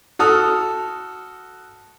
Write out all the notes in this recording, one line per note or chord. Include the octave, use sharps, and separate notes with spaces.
F#4 A4 D#6 F6